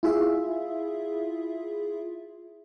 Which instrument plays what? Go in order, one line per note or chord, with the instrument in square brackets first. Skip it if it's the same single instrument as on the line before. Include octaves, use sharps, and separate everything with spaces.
[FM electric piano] E4 F4 G#4 E5